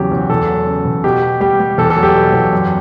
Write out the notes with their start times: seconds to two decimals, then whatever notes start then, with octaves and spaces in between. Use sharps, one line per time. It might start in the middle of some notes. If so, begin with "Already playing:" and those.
Already playing: E2 C#3 F#3 G4
0.12 E2
0.30 E2 A4
0.48 F#3
0.67 C#3
0.85 E2
1.04 B2 G4
1.22 B2
1.41 G3 G4
1.60 G3
1.78 E2 A4
1.90 A4
1.97 F#3
2.03 G4
2.15 B2
2.34 E2
2.52 F#2